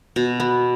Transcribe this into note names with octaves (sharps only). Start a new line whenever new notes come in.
B2
B3